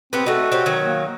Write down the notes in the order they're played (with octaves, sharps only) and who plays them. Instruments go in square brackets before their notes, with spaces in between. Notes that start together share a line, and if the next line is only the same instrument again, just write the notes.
[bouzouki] B3 G4 B4 [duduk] C4
[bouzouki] A3 D#4 [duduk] F#4
[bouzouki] C4 G4 C#5
D#3 F#3
[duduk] A#3